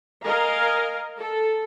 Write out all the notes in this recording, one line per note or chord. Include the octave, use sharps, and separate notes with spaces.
A#4 D#5 F5 G#5 A#5
A4